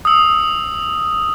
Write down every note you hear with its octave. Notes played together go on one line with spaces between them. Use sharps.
D#6 E6